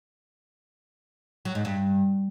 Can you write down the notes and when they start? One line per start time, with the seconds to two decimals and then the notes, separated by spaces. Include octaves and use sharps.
1.45 F#3
1.55 G#2
1.65 G2